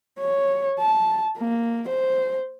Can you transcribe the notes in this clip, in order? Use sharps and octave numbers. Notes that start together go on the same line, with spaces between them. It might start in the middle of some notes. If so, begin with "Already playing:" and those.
C#5
A5
A#3
C5